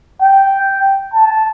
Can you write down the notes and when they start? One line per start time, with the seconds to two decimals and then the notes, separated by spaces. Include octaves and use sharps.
0.22 G5
1.14 A5